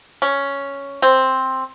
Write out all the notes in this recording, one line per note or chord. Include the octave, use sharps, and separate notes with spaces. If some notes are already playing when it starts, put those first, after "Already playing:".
C#4
C4